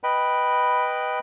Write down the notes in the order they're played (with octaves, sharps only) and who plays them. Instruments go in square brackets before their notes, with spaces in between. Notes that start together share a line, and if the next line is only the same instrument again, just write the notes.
[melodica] B4 D#5 G5 B5